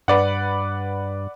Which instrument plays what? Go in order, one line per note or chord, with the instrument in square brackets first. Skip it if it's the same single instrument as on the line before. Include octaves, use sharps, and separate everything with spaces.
[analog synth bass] G2 [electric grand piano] B4 D5 F#5